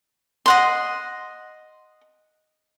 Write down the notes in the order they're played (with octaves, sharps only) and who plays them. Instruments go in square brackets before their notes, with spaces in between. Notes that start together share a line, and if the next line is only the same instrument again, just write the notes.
[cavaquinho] D#5 F#5 C6